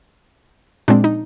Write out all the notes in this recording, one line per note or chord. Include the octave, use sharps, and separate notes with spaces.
A#2 F3 G#3 C4 D4
D#4